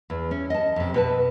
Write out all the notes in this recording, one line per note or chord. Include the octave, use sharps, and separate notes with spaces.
E2
C#4
D#5 A5
F2 C3
B2 B4 A5